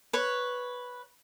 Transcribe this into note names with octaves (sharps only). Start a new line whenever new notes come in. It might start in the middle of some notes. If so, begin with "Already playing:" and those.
B4 C#5